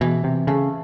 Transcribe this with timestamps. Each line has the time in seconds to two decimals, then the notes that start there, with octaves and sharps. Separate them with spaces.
0.01 B2 E3
0.24 C3
0.47 C#3 A3